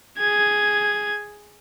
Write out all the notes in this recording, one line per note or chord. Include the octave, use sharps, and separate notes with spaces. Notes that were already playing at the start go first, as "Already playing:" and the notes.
G#4 G#6